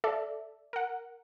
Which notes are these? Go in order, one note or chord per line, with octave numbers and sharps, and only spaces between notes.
A4 D5 E5
A#4 F#5